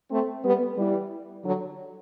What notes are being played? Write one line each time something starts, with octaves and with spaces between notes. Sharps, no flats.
A3 C4
G3 B3
E3 G3
D3 F#3